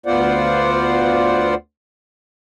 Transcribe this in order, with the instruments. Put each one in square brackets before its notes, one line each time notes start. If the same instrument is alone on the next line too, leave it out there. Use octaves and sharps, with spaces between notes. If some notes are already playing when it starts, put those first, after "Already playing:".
[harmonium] D2 B3 F4 C5 D5 F#5